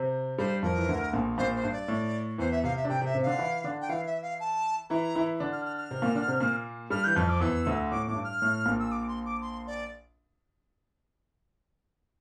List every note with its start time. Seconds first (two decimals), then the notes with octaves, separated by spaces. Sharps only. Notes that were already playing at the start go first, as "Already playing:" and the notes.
Already playing: C3 C4
0.38 G2 G3 C5
0.62 F2 F3 A#4
0.78 E3
0.88 D2 D3
1.13 A#1 A#2
1.38 A#1 A#2 C5
1.56 C5
1.63 G2
1.72 D5
1.88 A2
2.38 E2 E3 C5
2.51 E5
2.64 C3 C4 F5
2.77 E5
2.85 D4
2.89 C3 C4 G5
3.01 C3 C4
3.05 E5
3.14 C3 C4
3.23 D3 D4 F5
3.39 E3 E4
3.64 D3 D4
3.81 G5
3.89 E3 E4 F5
4.06 E5
4.22 F5
4.40 A5
4.89 E3 E4 A#5
5.15 E3 E4
5.40 D3 D4
5.52 F6
5.65 F6
5.77 F6
5.91 C3 C4
6.02 A#2 A#3
6.15 D3 D4
6.28 C3 C4
6.40 A#2 A#3
6.90 G2 G3 F6
7.04 E3 G6
7.15 F2 F3 F6
7.30 D6
7.40 E2 E3 E6
7.66 D2 D3
7.91 A2 D6
8.08 A2 D6
8.16 G2
8.24 F6
8.42 A2
8.66 A#1 A#2
8.79 E6
8.92 D6
9.08 C6
9.25 D6
9.42 C6
9.67 D5